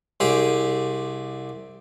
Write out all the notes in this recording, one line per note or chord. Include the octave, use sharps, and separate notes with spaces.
C2 G4 G#4